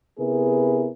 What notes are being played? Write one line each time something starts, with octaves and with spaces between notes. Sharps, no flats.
C3 B3 E4 G#4 A#4 B4